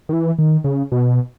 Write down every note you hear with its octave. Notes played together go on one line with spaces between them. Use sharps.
D#3
E3
D#3
C#3
B2